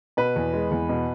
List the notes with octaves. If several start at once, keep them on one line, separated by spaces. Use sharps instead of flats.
B2 B4
E2
G#3
E2
B2